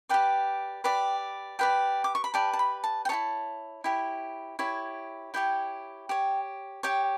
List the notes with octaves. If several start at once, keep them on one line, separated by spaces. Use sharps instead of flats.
G4 B4 D5 G5
G4 B4 D5
G4 B4 D5 G5
D6
C#6
B5
G4 B4 D5 A5
A5
B5
A5
G5
E4 G4 C#5 A5
E4 G4 C#5
E4 G4 C#5
E4 G4 C#5 G5
G4 C#5
G4 C#5 G5